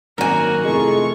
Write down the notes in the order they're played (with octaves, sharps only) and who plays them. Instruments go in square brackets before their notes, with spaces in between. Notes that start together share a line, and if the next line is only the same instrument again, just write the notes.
[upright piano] G#1 F#2 [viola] A#3 F#4 [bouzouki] A#4 G#5
[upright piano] F1 A3 E4 [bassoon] G#3 [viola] F4 C#6